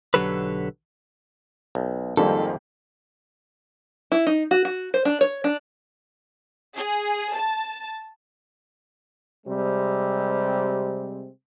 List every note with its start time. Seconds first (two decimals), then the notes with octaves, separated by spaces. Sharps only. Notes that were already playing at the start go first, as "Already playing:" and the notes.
0.14 B1 D3 F#3 G4 A4 B4
1.75 B1
2.17 F2 G#2 D#3 G3 A#3 A4
4.12 E4
4.26 D#4
4.51 F#4
4.65 F#4
4.94 C5
5.05 D4
5.21 C#5
5.44 D4
6.75 G#4
7.34 A5
9.47 C3 G3 G#3 C4